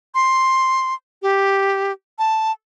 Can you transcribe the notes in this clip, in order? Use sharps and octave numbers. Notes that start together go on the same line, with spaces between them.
C6
G4
A5